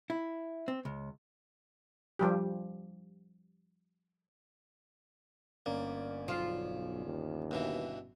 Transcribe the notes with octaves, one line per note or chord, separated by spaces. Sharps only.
E4
C4
C#2
F3 G3 G4
G1 A#3 C#4 D5
B1 F3 F4
D#2
G2 B2 E3